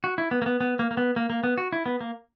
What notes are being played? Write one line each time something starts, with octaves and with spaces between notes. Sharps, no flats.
F#4
E4
B3
A#3
B3
B3
A#3
A#3
B3
A#3
A#3
B3
F#4
E4
B3
A#3